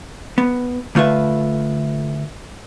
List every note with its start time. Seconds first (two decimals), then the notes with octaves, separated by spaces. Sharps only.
0.38 B3
0.95 D3 A3 F4 B4 E5